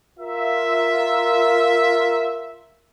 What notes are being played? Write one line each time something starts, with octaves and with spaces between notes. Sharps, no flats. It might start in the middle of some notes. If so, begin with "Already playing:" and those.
F4 A#4 E5